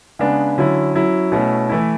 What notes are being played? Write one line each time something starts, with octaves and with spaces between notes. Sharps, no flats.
C#3 G#3 B3 D4
D3 F#3 C#4 E4
F#3 C#4 E4
B2 A3 C#4 E4
E3 A3 E4